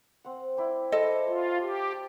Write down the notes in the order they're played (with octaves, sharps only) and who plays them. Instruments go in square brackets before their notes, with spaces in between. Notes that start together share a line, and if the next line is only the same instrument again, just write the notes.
[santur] C4 F#5
E4 D5 G5
[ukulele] A4 D#5 [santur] C5 A5
[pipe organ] F4 [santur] F5 C6
[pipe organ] G4